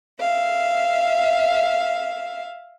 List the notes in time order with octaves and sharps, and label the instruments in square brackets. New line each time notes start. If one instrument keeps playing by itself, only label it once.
[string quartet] E5 F5